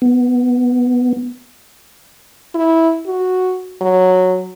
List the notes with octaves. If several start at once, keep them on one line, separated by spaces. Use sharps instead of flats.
B3
E4
F#4
F#3